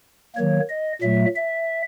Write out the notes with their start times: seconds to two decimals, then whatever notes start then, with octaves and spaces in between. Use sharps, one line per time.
0.35 D#3 F#3 A#3 C#5
0.69 D#5
1.02 A#2 F#3 A3 E5
1.35 E5